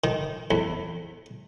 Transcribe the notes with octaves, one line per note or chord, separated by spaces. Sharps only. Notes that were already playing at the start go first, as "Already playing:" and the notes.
D#3
E2